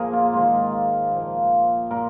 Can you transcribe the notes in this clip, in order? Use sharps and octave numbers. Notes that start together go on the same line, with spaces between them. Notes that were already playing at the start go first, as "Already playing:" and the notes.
Already playing: A#2 F3 A#3 G#4 A#4
F4
G#2 D#3 F4
A#2 F3
A#2 A#4